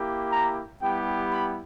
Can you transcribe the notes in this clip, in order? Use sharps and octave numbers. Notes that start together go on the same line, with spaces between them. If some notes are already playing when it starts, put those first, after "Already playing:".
Already playing: A#3 E4 G4
A#5
G3 B3 E4 G4 G5
B5